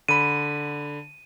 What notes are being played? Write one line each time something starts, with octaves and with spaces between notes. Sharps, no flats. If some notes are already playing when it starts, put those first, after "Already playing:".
D3 B5 D#7